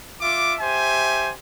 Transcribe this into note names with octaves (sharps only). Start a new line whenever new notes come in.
F4 E5 D6
G4 C5 E5 G#5